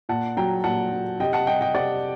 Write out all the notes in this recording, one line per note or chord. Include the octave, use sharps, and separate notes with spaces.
A#2 F#5 A5
F#3 G5 A#5
A#2 F#5 A5
F#3
C3 D#5 G5
F#5 A5
G3 D#5 G5
D#5 G5
C3 D5 F#5